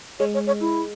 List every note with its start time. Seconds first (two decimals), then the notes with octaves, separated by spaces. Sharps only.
0.19 G#3 C#5
0.34 C#5
0.47 C#5
0.61 E4